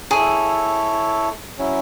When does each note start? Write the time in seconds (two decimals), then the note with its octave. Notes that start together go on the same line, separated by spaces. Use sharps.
0.11 E4 G#4 A4 C#5
1.58 F#3 C#4 E4